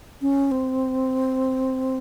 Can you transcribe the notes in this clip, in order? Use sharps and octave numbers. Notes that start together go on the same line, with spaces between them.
C#4
C4